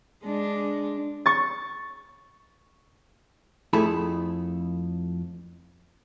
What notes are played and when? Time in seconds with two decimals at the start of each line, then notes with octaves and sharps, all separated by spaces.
0.24 G#3 D4
1.26 C#6 A6
3.73 F2 A3 E4 G#4 A5 B5